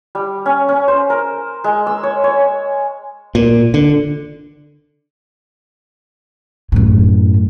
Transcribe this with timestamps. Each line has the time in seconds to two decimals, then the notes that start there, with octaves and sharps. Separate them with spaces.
0.15 G3
0.46 C#4
0.69 C#4
0.88 C5
1.10 A#4
1.64 G#3
1.87 E6
2.03 C#5
2.24 C#5
3.35 A#2
3.74 D3
6.72 F#2 A2